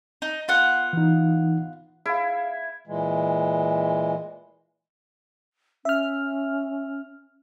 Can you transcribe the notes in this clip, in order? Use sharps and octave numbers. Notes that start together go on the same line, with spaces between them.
D#4
B3 F4 F#5
E3 D#4
E4 G#4 F5
A#2 E3 G#3
C#4 E5 F6